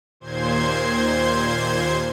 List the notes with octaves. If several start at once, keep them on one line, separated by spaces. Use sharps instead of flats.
D#2 A#2 C5 C6 G#6